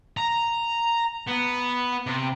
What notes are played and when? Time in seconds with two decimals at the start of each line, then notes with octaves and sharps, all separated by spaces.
0.17 A#5
1.27 B3
2.07 C3